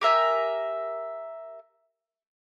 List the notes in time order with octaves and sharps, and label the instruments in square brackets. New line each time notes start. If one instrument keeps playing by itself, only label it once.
[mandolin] G4 A#4 E5 G#5